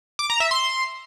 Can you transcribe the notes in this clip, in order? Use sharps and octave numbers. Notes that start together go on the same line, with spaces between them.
D6
A#5
E5
C6